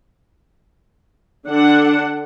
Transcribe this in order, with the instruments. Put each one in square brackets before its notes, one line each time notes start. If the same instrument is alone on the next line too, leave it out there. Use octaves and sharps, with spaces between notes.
[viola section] D3 D4 F#5